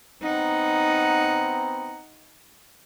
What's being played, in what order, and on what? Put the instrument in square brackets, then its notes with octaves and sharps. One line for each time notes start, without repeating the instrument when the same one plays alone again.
[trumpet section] B3 C4 A#5 [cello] D#4 F#5